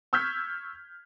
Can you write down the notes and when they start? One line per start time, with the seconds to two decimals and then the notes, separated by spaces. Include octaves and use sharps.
0.13 C#6 E6 F6 G6 G#6 B6